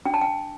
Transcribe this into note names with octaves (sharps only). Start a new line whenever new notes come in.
D4 G5
A5
G5